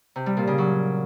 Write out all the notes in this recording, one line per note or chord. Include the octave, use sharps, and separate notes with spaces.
C3
G3
A#2
C#3
F#3